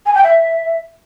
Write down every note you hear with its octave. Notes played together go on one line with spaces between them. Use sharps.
G#5
G5
E5